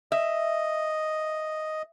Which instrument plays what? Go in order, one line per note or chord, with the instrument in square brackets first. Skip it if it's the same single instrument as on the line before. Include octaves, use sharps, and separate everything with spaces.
[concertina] D#5 [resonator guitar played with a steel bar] E5